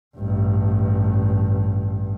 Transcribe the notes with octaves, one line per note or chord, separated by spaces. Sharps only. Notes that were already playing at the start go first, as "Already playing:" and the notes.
A1 G2